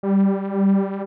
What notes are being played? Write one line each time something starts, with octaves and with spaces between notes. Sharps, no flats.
G3